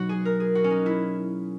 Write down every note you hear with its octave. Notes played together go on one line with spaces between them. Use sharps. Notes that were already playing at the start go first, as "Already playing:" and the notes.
Already playing: B2 F#3 D#4 F#4
G#4
A#4
G#4
F#4
C#4
D#4
E4